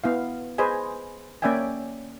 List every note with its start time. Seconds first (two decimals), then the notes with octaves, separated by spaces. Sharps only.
0.04 B3 E4 F5
0.58 G#4 B4 C5 D#5 G#5
1.42 A#3 C#4 D5 E5 G5 G#5